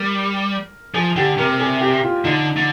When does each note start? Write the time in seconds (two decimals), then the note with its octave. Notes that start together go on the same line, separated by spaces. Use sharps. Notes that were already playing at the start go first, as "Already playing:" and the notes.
Already playing: G3 A#4
0.94 F3 G#4
1.16 D3 G4
1.38 C3 A#4
1.60 G#4
1.81 G4
2.03 F4
2.25 D3 D#4
2.57 D3